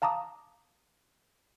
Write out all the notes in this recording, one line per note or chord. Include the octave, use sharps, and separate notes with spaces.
F5 A5 A#5 D6 D#6